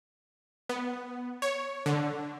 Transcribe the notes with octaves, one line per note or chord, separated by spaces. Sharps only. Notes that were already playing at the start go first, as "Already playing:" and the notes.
B3
C#5
D3